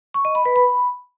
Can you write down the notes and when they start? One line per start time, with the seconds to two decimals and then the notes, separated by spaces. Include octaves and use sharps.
0.14 C#6
0.25 D#5
0.35 B5
0.45 B4
0.56 B5